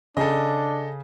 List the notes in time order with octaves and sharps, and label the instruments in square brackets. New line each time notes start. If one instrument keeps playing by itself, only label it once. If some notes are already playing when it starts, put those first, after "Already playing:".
[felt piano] C#3 G#4 [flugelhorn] D4 [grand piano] A4 D#5